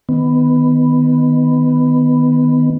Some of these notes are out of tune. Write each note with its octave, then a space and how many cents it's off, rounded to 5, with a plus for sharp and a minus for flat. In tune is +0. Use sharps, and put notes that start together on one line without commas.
D#3 +0 B3 +10